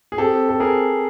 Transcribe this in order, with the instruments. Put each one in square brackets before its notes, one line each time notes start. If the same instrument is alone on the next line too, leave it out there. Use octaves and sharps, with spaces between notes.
[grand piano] G#4
[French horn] C4 [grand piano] G4 A4
[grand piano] A4
G#4 A#4